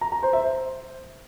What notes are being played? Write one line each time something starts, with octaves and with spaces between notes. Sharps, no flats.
A#5
A#5
C5
E5
C5